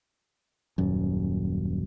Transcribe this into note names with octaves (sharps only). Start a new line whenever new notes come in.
D#1 F#2